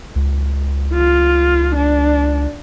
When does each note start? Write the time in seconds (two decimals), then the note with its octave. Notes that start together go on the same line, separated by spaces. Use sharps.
0.16 C#2
0.93 F4
1.75 D4